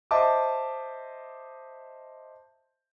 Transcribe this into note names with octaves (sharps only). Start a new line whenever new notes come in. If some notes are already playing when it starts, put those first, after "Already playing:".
C5 D#5 E5 A5 D6